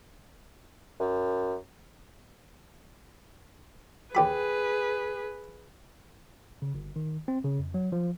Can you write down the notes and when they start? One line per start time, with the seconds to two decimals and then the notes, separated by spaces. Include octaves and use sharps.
1.00 F#2
4.15 D#2 G4 G#4 B4 B5
6.62 C#3
6.74 G1
6.96 D#3
7.28 C4
7.44 C#3
7.59 F2
7.74 F#3
7.92 F3